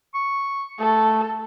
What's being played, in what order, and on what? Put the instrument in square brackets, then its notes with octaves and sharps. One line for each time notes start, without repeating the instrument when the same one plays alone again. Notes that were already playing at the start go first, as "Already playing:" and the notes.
[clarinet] C#6
[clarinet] A3 [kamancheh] A4